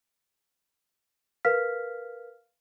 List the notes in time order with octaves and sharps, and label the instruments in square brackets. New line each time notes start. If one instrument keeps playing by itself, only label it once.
[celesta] A#4 B4 F5 F6 B6